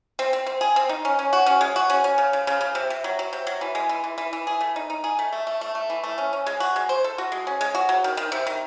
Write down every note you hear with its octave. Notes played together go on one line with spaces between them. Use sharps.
C4
C4
C4
G#4
C4
D#4
C#4
C#4
F#4
C#4
G#3
F#4
C#4
C#4
C#3
C#3
C#3
C#3
C3
C3
F#3
F#3
C3
F#3
E3
G#3
E3
E3
E3
E3
G#4
A3
D#4
D#4
G#4
A3
A3
A3
A3
A3
E3
A3
C#4
C#4
G#3
F#4
G#3
C5
A4
F#4
G#3
C#4
G#3
F#4
F#3
D#3
D#3
C3
D#3